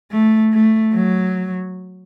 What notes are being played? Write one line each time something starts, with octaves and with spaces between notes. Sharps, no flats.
A3
A3
F#3